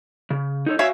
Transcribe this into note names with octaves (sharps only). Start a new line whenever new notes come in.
C#3
D#4 A4 C#5
F#4 C#5 E5 F5 G#5